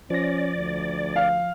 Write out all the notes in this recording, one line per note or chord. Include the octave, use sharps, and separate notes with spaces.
F3 C#4 D5 A#6
D2
F5